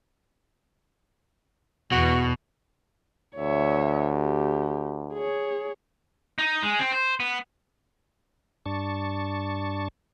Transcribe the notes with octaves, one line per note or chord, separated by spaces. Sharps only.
E2 B2 F#4
D2 C#5 E5
G4
G#4 C#5
D#4
G#3
C4
C5
B3
G2 D4 A5 C#6